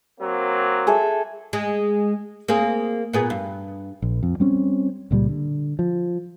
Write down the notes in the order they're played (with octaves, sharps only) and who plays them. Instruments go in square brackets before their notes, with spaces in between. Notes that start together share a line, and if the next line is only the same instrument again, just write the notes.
[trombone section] F#3 A#3 C4
[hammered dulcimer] G#4 A4 E5
[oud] G#3 G#4
A#3 C4 G#4
A#2 B3 G#4
G2
[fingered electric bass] A#1
F2
G3 C4 C#4
C#2 A#2 F3 G3
D3
F3